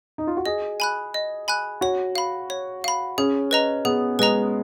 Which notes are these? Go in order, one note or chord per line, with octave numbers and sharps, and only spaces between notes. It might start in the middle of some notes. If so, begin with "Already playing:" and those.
D#4
F4
F#4
G#4 D#5
G#5 B5 F#6
D#5
G#5 B5 F#6
F#4 C#5
F5 B5
C#5
F5 B5
C#4 G#4
B4 D#5 A#5
B3 G#4
G#3 B4 D#5 A#5